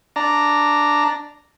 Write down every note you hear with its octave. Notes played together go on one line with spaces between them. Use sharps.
D4 A#5